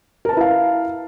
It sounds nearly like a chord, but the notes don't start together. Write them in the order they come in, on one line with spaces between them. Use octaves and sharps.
A#4 A5 B4 E4 F5